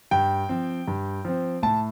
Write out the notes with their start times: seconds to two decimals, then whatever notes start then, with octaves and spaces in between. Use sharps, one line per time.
0.11 G2 G5
0.49 F3 C4
0.88 G2
1.25 F3 C4
1.63 A2 A5